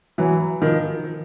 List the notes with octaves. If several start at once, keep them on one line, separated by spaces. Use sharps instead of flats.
E3 F#3
D#3 F3